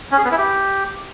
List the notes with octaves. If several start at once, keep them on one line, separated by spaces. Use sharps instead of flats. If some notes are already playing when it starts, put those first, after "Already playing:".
C#4
G#4
B3
E4
G4